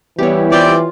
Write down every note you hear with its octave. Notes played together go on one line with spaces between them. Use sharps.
E3 G3 B3 E4 G4 C#5
C4 F4 G4 D5